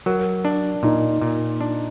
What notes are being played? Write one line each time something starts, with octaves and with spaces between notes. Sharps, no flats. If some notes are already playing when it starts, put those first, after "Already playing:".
F#3 A#4
D4
A#2 D#4
A#2
D4